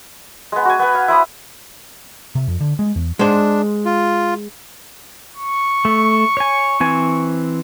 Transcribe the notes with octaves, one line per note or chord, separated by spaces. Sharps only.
G#3 B3
F#4 G#5
B3 B4
F5
E4 C5 B5 D#6
C3
F2
D3
G#3
E2
G#3 D4 C5
F4
C#6
A3
C#5 G#5
E3 C4 G#5